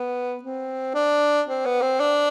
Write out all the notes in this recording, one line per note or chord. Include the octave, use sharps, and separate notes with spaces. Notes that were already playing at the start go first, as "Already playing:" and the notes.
Already playing: B3
C4
D4
C4
B3
C4
D4